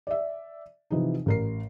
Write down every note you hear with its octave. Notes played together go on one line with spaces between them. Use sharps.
D5 E5
C3 E3 F3 D#4
A1 A#4 C7